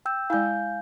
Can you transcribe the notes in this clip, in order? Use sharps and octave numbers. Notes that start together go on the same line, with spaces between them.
G5 E6 G6
G#3 E4 F5 G#5 G6